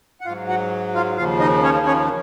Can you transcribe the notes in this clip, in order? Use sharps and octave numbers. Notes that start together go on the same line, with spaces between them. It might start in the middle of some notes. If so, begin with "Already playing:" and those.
F#5
G#2 F#3 F4 F5
F#4 F#5
F4 F5
D#2 C#3 F3 F4 F5
D#4 D#5
C#4 C#5
C#4 C#5